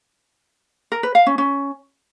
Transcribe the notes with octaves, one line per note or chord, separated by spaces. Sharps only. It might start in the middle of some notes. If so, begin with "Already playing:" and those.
A#4
B4
F5
C#4
C#4